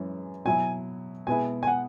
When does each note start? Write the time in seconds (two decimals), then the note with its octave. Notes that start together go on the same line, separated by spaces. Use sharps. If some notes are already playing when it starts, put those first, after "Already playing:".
Already playing: F#2 E3 G#3 C#4
0.45 B2 F#3 E4 G#5
1.27 B2 G#3 B3 E4 G#5
1.63 G#5
1.67 F#5